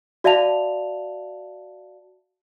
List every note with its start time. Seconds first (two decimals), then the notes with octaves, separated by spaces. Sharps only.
0.24 F#4 D5 E5 F5 A5 F7